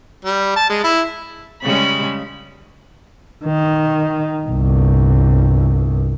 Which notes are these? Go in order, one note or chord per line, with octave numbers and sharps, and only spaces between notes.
G3
A5
G#3
E4
C#3 G3 G#3 C#4 B5
D#3
G1 C2